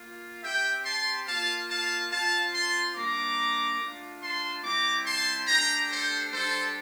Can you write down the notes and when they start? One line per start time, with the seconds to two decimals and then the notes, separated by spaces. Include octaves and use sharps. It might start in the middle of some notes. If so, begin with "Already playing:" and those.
Already playing: A#3 F4
0.43 C4 G4 E5 G5
0.85 A5 C6
1.26 A#3 F4 F5 A5
1.69 F5 A5
2.11 C4 F4 F5 A5
2.53 A5 C6
2.95 G3 A#3 D4 A#5 D6
3.79 A3 D4 F4
4.22 A5 C6
4.63 G3 C4 E4 G4 A#5 D6
5.05 A5 C6
5.48 A3 D4 G4 G5 A#5
5.90 A4 C5
6.32 G3 D4 G4 A4 C5